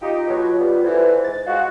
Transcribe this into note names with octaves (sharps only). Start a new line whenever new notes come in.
D#4 F4 G4
B2 F#3
G3 B3
D3 E3 C5
G#2 A6
G#3 F#4 F5